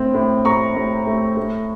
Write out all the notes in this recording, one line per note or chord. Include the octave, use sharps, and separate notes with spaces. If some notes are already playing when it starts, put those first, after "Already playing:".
Already playing: A2 C4
A2
A2 A#5 C#6
A2
A3
A3